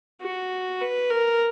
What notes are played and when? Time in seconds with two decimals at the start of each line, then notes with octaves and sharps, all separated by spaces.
0.21 F#4
0.81 B4
1.10 A#4